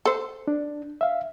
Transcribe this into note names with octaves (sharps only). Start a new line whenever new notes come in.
A4 C5
D4
E5 F5